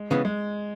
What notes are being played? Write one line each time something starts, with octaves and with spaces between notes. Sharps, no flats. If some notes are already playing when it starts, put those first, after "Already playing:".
Already playing: G#3
C#3 E3 B3
G#3